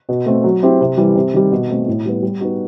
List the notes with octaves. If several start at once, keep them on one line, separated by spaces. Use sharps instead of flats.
B2
A3 C4
F#3
C4 E4 G4
C3
E3 G3
C3
D#3 G3
B2
A3 C4
A2
G3 B3
G3
B3 D#4 F#4